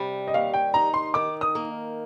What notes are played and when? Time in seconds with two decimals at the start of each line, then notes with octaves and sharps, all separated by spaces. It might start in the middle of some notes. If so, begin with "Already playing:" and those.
Already playing: C3 G3
0.28 D#5
0.34 D#2 F5
0.54 G5
0.74 D#4 A#5
0.94 C6
1.14 D#3 D6
1.41 D#6
1.55 A#3